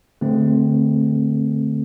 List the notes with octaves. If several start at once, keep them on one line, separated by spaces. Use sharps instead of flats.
D3 A3 C4